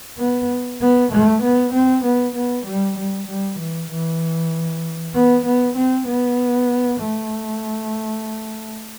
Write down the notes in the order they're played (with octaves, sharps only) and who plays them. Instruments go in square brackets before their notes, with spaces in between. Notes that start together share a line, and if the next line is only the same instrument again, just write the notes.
[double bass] B3
B3
A3
B3
C4
B3
B3
G3
G3
G3
E3
E3
B3
B3
C4
B3
A3